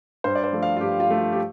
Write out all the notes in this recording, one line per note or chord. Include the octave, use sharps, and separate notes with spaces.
G2 C5
D5
C5
F3 A3
F5
F4
G2 G4
F4
F3 A3
F4
G4